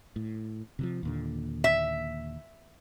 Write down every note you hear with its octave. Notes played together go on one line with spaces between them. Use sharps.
A2
C3 E3 F3
D#2 A#2 D3
E5